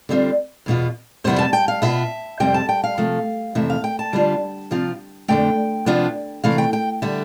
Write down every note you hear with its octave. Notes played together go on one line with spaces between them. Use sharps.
D3 G3 C4 F4
E2 B2 B3 F4
F2 C3 G3 B3 E4 C5
A5
G5
F5
B2 B3 F4 E5
F2 C3 G3 C4 G5
A5
G5
F5
C3 F3 A3
F2 C3 E3 A3 E5
F5
G5
A5
D3 G3 B3 D4 F4
C3 F3 C4 F4
F2 D3 A3 G5
C3 F3 B3 D4 F4
C3 E3 A3 F5
G5
G5
D3 G3 B3 E5